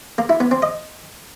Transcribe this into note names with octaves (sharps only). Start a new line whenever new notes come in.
A#3
E4
B3
C4
D#5